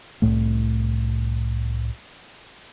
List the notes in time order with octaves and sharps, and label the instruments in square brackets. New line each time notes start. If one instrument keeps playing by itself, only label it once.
[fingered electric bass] C2 F#2 A2 A3